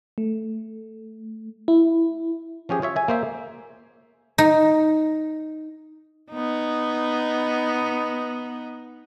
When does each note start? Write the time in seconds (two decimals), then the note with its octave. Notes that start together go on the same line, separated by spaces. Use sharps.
0.18 A3
1.68 E4
2.69 F3 C#4 G4 G#4
2.82 F4 C#5 E5
2.96 E5 G#5
3.08 A#3 C5 E5
4.38 D#4
6.32 B3 D#4